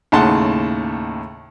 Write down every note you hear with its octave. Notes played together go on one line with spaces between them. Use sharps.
D#2 A2 C#3 F#5 A5 C6